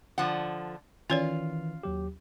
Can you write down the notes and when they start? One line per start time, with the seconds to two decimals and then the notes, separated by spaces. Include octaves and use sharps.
0.18 D3 F3 F#5
1.10 D#3 E3 C#4 F4 C#5 D5
1.83 D#2 F#3 G4